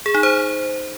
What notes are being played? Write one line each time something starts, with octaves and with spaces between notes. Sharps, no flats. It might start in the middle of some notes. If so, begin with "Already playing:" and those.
G#4
D#4
C5